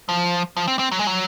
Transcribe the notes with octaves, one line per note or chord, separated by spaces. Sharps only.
F3
F3
C4
C4
F#3
G#3
F#3